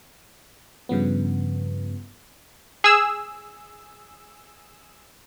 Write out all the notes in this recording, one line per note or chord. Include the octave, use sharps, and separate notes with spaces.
G2 C#3 F3 B3
G#4 E6